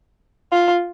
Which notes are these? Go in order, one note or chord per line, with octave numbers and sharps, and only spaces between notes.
F4